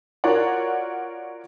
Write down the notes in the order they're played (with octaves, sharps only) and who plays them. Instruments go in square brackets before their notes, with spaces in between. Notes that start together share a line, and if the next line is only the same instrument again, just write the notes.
[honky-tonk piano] F4 F#4 A#4 C#5 D5 F#5